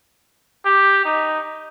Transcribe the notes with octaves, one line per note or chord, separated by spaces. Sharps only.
G4
D#4